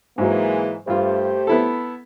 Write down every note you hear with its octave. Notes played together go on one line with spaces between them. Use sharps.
G#2 E3 F#3 G#3 A#3
G2 A3 F4 G4 C5
B3 E4 A4